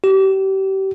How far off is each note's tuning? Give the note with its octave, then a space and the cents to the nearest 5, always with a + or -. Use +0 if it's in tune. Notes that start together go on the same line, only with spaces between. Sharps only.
G4 -30